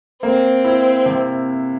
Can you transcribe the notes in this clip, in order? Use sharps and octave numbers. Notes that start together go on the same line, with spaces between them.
A#3 C4
E4
C3